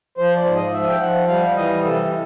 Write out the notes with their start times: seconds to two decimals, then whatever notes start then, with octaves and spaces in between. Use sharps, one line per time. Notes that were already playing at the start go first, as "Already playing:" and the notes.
0.18 F3 C5
0.36 D5
0.45 G#2
0.55 D#5
0.73 F3 E5
0.89 G5
1.00 F3 F#5
1.28 G3 F5
1.56 E3 D#5
1.83 C3 A4
2.10 C3